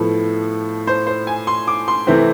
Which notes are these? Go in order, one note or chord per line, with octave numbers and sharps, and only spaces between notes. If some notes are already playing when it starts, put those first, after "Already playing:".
Already playing: A2 F3 B3 A4
C5
C5
G#5
C6
D6
C6
C3 E3 A3 C4